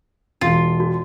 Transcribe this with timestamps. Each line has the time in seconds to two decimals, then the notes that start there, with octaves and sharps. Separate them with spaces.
0.41 E1 F4
0.80 F#4